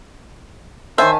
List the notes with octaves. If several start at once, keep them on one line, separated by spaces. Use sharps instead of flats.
D#3 C5 E5 G#5 A5